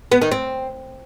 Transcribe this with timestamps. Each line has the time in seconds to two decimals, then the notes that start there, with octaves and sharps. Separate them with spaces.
0.12 B3
0.22 D#3
0.32 C4